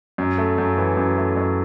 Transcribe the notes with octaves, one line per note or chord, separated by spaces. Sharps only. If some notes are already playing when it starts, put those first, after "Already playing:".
F#2
A3
F#2
E3
F#2
A3
F#2